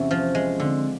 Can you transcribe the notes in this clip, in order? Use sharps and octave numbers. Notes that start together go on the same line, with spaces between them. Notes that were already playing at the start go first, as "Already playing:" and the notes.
Already playing: E2 C3 C#4
F3
G#3
D3 C4